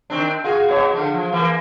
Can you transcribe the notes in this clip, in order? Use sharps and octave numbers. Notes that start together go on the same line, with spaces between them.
D#3 C4 D4
F4 F#4 G#4
B2 C#5
D3 F3
F3
E3 A#3